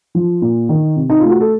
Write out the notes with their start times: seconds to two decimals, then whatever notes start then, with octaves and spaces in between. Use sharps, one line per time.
0.15 F3
0.42 A#2
0.69 D#3
0.96 C3
1.10 D#4
1.20 A3 F4
1.30 F#4
1.40 A4